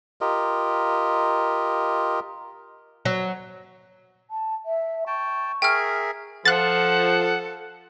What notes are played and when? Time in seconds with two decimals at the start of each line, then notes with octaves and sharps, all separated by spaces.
0.21 F4 G4 A#4 D#5
3.05 F#3
4.31 A5
4.65 E5
5.07 G5 A5 C#6
5.62 G#4 A#4 E5 G5 F6
6.45 F3 A4 F#5 F#6 A6